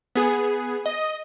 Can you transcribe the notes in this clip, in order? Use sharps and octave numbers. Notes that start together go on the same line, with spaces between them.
B3 G#4
D#5